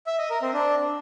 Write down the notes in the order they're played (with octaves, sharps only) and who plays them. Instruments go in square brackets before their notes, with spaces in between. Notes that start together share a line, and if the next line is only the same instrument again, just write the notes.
[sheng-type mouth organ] E5
D#5
A#4
C4
D4